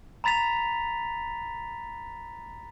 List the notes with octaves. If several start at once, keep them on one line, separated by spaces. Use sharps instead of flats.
A#5 B5 A6 B6 F7